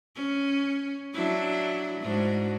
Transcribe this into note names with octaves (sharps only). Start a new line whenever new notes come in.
C#4
F#3 D4 E4
G#2 D4 F#4